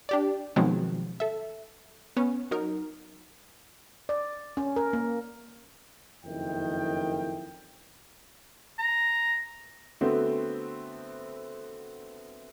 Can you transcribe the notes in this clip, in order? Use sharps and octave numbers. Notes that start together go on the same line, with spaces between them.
D4 G4 D5
B2 D#3 F3 F#3 G#3 C4
A4 E5
B3 C#4
F#3 D#4 A#4
D5
C#4
A#4
A#3
F#1 F2 D#3 E4 G5
A#5
D3 A3 B3 C4 F#4